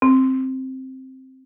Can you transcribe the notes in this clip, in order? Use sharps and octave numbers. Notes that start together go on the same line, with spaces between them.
C4